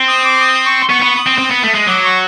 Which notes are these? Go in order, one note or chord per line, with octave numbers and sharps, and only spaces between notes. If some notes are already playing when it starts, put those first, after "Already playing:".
Already playing: C4
D#6
D6
D#6
C#6
B3 C#6
B3
D#6
C4
C4
B3
A3
G#3
F#3 D6
C#6